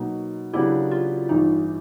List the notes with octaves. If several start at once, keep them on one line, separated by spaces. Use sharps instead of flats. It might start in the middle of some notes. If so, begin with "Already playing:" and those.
Already playing: B2 F#3 A#3 D#4
C#3 F#3 B3 D4 E4 G4
F4
A1 G2 E3 D#4